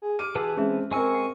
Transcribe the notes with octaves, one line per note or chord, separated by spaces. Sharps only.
G#4
G4 D6 F6 D#7
E3 F#4 G#4 B4 F#5 A5 E6
G#3 C4 C#4 G#4 E5
G#3 C4 A#4 G#5 C#6 E6
F#5